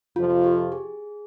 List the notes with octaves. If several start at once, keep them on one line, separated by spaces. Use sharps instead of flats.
F2 C3 F3 F4
G4
G#4